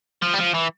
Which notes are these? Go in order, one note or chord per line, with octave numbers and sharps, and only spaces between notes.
F3
G3
F3
E3